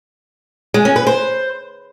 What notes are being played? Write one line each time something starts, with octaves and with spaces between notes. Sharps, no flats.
G#3
C#4
B4
C5